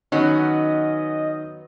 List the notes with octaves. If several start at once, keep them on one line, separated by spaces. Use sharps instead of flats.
D#3 F#3 B3 C#4 D#5